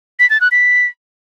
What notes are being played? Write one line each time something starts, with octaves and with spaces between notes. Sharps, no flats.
B6
A6
F#6
B6